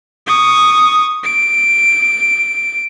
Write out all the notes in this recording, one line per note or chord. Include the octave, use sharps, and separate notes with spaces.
C#6 D#6
D7